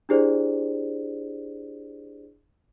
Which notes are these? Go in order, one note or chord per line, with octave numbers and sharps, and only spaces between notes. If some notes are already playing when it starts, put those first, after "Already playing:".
D4 E4 G4 G#4 C5 D5